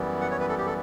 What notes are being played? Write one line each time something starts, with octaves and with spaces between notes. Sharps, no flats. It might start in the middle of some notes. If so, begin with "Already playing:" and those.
Already playing: F#2 E3 G3 B3
F#5
C#5
B4
A4
G4
A4